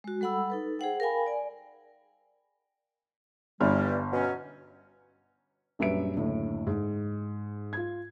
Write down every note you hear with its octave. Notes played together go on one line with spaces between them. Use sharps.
G#3 F#4
G3 A4 F#5 B5 E6
D#4 A4 B4
G#4 C5 F#5 G5
A#4 F5 G5 G#5 B5
D5 G#5
G1 G2 E3 G3 F6
B2 F#3 C#4
A#1 F#2 G3 B4 E5 D7
F#1 D2 A2
G#2
F4 G#6